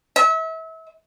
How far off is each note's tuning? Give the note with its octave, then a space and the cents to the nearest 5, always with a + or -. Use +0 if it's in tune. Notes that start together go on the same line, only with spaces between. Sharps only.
E5 -35